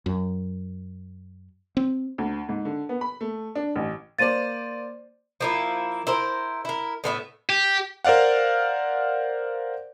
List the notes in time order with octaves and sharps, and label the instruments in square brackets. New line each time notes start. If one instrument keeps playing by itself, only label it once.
[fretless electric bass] F#2
C4
[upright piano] D2
G#2
D3
B3
B5
A3
D4
A1
[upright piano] A#3 C5 D5 [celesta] A6 D#7
[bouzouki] F3 A#3 E4
E4 A#4 C5
E4 A#4
A2 B3 E4 E5
[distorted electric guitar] G4
[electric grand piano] A#4 C5 D5 F5 F#5